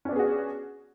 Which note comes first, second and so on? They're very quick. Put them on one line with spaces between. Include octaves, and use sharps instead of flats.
C#4 D4 B3 G#4 F#4